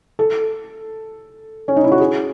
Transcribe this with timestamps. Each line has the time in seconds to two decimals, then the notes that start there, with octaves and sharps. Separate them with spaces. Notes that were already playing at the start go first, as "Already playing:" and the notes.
0.19 A4
1.68 C#4
1.76 D#4
1.84 E4
1.92 F#4
2.00 G#4